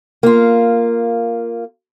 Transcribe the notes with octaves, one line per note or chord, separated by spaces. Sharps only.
A#3 F4